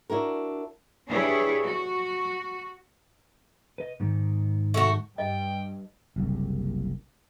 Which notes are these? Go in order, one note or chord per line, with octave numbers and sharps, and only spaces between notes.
D4 E4 F#4 A#4
D4 E4 G4 G#4 B4 C#5
F#4
B4 D#5
G#2 D#3
A3 F#4
G2 D#5 G5
F#1 C2